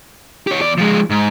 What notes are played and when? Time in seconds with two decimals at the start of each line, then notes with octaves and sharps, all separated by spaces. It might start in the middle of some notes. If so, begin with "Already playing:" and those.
0.47 G4 C#5
0.61 E2 D5
0.78 F3 G#3
1.10 G#2